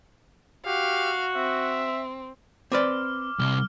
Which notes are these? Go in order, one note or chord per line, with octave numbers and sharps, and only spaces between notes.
F#4 G4 F5
C4 E5
C4 B4 D5 D6 F6
C2 C3 F6 G7